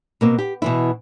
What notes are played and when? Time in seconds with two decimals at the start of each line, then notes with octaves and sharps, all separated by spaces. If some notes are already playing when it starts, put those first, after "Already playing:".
0.21 B2 A#3 C4
0.39 G4
0.62 B2 E3 E4